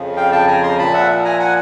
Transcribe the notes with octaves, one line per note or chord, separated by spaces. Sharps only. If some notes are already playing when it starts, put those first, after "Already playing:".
Already playing: F2 C#3 F3
F5 G5
G5 A5
G#5 A#5
A#5 C6
A#2 F3 A5 B5
E5 F#5
G#5 A#5
F#5 G#5